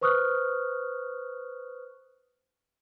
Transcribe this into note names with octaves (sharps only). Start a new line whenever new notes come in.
B4 C5 C#6 D#6 F6 F#6